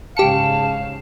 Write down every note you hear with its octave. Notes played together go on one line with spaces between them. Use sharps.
G#2 C#3 G4 F5 A5 C#7